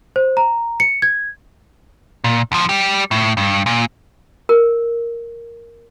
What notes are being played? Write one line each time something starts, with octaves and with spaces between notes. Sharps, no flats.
C5
A#5
C#7
G#6
A#2
D2 F3
G3 G4
A2
G2
A#2
A#4